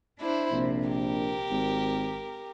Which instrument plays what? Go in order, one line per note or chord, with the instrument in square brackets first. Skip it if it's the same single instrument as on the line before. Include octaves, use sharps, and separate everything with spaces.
[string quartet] D4 E4 C5
[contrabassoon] A#1 [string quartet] C3
[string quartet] G4 A#4
[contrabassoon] G#1